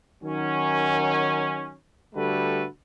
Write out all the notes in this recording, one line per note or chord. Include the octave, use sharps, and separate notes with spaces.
D#3 F#3 C#4
D3 G3 A3 F#4 A4 B4